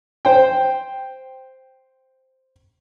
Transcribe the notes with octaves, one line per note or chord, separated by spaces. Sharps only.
C5 G5